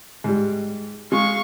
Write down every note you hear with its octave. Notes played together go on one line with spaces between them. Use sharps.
G#2 G3
G#3 F5 C#6